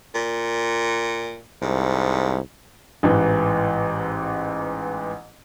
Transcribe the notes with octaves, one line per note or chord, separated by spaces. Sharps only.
A#2
C2 G#2
A1 G#2 E3